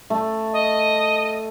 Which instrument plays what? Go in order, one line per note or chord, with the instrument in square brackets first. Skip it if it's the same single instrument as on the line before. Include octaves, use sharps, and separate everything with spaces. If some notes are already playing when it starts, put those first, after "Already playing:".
[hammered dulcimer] A3
[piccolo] D#5